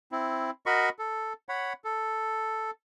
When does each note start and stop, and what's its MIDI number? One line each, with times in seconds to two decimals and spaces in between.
0.12 0.51 60
0.12 0.51 64
0.66 0.89 66
0.66 0.89 70
0.66 0.89 75
0.66 0.89 83
0.66 0.89 85
0.99 1.33 69
1.49 1.73 73
1.49 1.73 78
1.49 1.73 83
1.84 2.71 69